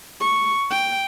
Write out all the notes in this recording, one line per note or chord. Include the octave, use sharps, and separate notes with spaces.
C#6
G5